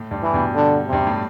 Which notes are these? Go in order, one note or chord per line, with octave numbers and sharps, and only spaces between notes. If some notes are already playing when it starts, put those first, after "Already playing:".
Already playing: A2
G2
E3
G2 B2
D3
G2 C3
A2